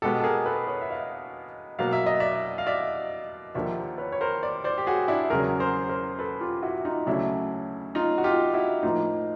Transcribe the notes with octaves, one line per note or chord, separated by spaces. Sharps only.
B2 G#3 B3 G4 A4
A4
G#4 A#4
A4 B4
B4 C#5
E5
D#5 F5
B2 F#3 A#3 F5
E5
D#5
D5 E5
F5
D5 E5
D#2 D3 F3 A#3 D5 E5
B4 C#5
C#5
A#4 C5
C5 D5
C5 D5
G4
F#4 G#4
D4 E4
E2 C#3 F#3 G#4 A#4
A#4 C5
A#4 C5
A4 B4
F4 G4
E4 F#4
D#4 F4
D2 C#3 F#3 A3 D4 E4
D#4 F4
F#4
F4 G4
E4 F#4
A2 F3 A#3 D#4 F4